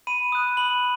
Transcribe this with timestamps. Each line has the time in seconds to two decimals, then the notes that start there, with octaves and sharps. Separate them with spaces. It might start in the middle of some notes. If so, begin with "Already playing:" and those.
0.07 B5 D#7
0.32 D#6 F#6
0.57 B5 F#7